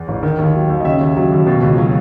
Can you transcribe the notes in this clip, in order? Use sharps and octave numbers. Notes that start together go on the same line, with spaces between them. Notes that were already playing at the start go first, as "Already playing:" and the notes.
Already playing: E2
A1
D#3
D#2
F#3
D#2
D#5
C#3 E5
D#2
F#3
D#2
B2
C#2
F#3